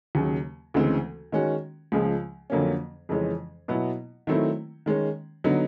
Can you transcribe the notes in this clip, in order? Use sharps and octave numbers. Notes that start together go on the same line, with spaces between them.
D#2 C#3 F#3
D2 C#3 E3 G#3 C4
D#3 G#3 C#4 F#4
C#2 C#3 F3 G#3
F2 D3 F#3 A#3 C#4
F2 C#3 E3 G#3 C#4
B2 F#3 B3 E4
D#3 F#3 A3 C4 E4
D#3 G#3 C#4
D3 F#3 B3 D#4